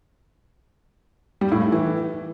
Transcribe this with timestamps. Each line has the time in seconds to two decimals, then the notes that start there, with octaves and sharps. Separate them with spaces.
1.41 G3
1.52 A2
1.62 A3
1.72 E3